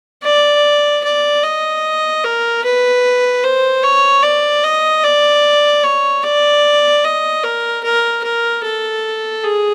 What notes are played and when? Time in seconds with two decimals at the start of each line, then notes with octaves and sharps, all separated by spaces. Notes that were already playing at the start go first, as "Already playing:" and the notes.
0.23 D5
1.04 D5
1.43 D#5
2.24 A#4
2.64 B4
3.43 C5
3.83 C#5
4.23 D5
4.64 D#5
5.04 D5
5.84 C#5
6.24 D5
7.04 D#5
7.44 A#4
7.84 A#4
8.24 A#4
8.63 A4
9.43 G#4